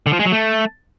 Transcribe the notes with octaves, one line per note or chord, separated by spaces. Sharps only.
D3
F3
G#3
F#3
A3